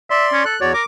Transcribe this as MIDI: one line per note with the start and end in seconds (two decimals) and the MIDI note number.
0.10 0.45 74
0.10 0.27 76
0.10 0.45 84
0.33 0.42 61
0.45 0.56 69
0.45 0.60 90
0.61 0.73 40
0.61 0.73 66
0.61 0.73 73
0.61 0.70 74
0.74 0.82 70
0.74 0.86 86